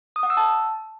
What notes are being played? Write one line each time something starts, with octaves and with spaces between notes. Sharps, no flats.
D#6
F#5
E6
A5